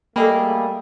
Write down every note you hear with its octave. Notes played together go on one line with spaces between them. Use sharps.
G3 A3 A#3 G#4 A4 D#5 G5 B5